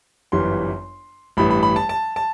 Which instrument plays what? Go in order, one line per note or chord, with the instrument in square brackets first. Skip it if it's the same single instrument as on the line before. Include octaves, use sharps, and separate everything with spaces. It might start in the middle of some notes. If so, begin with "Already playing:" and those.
[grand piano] G1 F#2 E3 G3 C6
A1 G2 E3 B5
B5
B5
A5
A5
A5